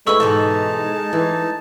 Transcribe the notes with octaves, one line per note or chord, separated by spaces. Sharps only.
D2 G#3 E4 A4 B4 C#6 E6
G#2 B2 E3 D#4 A5
E3 G#3